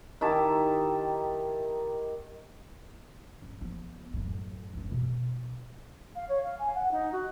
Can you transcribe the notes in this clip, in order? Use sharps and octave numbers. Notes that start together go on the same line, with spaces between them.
D#3 E4 G4 A5
C#4
F3 B3
F#2 A2
F1 C#4
B2
F5
C#5
F5
G#5
F#5
D#4
F#4